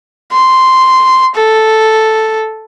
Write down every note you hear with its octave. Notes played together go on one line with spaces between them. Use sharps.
C6
A4